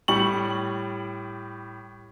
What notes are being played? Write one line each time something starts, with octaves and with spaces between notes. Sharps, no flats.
A2 G3 C#6 F#7